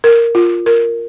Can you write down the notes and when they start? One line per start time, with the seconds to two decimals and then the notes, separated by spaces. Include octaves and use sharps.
0.04 A#4
0.35 F4
0.66 A#4